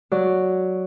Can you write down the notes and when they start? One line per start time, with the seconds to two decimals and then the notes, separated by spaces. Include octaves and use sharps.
0.11 F#3 F#4 D5